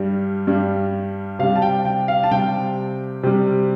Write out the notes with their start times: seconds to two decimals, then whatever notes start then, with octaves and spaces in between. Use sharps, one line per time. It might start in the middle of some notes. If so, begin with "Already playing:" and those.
Already playing: G2 G3
0.47 G2 G3
1.39 C3 G3 F5
1.56 A5
1.62 G5
1.85 G5
2.08 F5
2.23 A5
2.31 C3 G3 G5
3.23 C3 G3